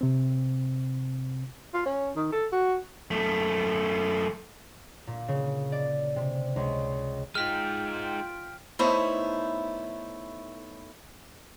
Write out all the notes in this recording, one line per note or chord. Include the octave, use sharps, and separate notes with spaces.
C3 C4
F4
C#4
D#3
A4
F#4
F#2 A3
A#2
C#3
D5
C3
C#2
G#3 D#4 F4 G5 F6 B6
A3 B3 D#4 E4 C5 C#5